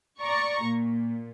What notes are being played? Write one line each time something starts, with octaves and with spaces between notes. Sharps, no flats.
D5 A#5 C#6
A#2